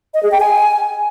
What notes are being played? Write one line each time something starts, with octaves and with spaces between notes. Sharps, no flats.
D#5
G#4
G5
G#5